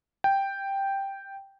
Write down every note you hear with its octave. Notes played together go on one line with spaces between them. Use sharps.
G5